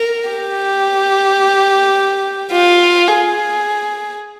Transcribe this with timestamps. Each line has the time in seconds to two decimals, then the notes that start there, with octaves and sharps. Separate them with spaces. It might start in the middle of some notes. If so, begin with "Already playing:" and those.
Already playing: A#4
0.30 G4
2.52 F4
3.08 G#4